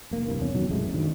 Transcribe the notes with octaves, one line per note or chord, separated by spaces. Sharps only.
F1 A#3
C2 G2
E2 C#4
B2 D#3 F#3
A1 F#2 G#3 A3
D2 D#3 G#3